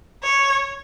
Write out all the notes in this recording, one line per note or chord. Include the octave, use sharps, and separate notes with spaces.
C#5